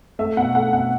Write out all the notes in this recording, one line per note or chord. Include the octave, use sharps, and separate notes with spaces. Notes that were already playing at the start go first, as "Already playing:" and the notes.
A3 E5
B2 F#5
A3 F#5
B2 F#5